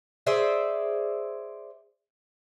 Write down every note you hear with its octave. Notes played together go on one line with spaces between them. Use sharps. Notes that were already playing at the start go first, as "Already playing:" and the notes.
G#4 C5 D5 E5